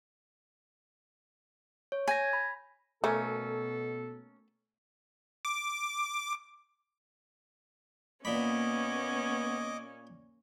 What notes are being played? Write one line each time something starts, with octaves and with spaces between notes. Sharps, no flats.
C#5
G#5 G6 G#6 A#6
B5
B2 A3 A#3 C#4 A4
D6
A#2 A#3 B3 C#4 D#5 B5 D6